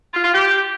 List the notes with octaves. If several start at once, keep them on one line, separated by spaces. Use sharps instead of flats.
F4
F4
G4